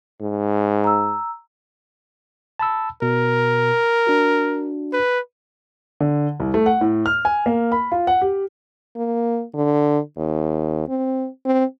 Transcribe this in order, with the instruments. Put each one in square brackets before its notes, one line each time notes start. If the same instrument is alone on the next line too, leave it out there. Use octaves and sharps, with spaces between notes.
[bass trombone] G#2
[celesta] A#5 E6
[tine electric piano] A5 B5 E6
[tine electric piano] B2 [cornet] A#4
[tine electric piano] D4 F#4
[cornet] B4
[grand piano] D3
C2
A3
F#5
A2
F6
G#5
A#3
B5
F4
F#5
G4
[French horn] A#3
D3
D#2
C4
C4